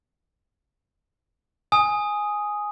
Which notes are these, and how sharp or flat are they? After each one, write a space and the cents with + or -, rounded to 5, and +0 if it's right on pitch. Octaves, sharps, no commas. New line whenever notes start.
G#5 +0 D#6 +5